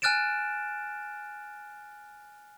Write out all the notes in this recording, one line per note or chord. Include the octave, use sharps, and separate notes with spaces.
G#5 F6 F#6 A6 D7 E7